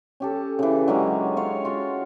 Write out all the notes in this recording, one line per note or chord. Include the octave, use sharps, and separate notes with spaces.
C#4 G4 A4
C#3 E3
D3 F#3 G#3 C#4
F4 C#5 F5
F4 F#4